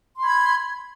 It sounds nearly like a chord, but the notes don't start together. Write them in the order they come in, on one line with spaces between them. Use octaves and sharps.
C6 B5 G#6